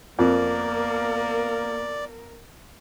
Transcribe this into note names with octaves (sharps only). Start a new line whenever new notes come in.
F2 A#3 B3 A#4 D5